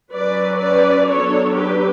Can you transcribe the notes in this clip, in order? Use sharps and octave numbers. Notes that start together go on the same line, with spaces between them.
F#3 C#4 B4 D5
B4 D5
F#3 B3 D4 A4 C#5
G4 B4